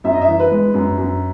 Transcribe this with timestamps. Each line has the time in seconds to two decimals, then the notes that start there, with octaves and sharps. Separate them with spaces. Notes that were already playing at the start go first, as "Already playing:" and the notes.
0.04 F#2 E5
0.13 D#5
0.22 E5
0.28 E3
0.39 B4
0.51 G#3
0.74 F#2
0.98 F#2